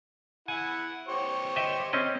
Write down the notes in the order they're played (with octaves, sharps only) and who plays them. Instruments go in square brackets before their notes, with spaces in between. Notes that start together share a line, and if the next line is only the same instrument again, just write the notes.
[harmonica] E4 F#5 [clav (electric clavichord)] G#5
[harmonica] G4 C5 C#5
[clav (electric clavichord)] D#5 E5 G5
C4 C#4 D#5